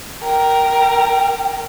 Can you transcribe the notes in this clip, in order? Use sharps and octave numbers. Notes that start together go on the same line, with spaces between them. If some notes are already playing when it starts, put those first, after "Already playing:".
A#4 G5